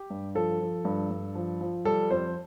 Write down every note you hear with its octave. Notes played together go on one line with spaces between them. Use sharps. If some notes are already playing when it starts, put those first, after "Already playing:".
Already playing: G4
G2
F3 A4
F3
G2
G2
F3
F3
G3 A4
F2 C5